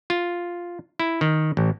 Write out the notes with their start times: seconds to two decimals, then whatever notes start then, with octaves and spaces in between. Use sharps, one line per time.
0.10 F4
1.00 E4
1.21 D#3
1.57 A1